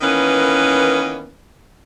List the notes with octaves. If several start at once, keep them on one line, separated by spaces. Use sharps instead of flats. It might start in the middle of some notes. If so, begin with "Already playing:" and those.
D#3 E3 A#3 B3 C#4 B4